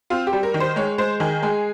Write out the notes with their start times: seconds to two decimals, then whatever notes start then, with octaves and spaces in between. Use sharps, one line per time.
0.10 C4 F4
0.27 G4
0.33 G3
0.43 A#4
0.54 D#3
0.60 C5
0.76 G#3 C#5
0.98 G#3 C5
1.20 D#3 G#4
1.42 G#3 G#4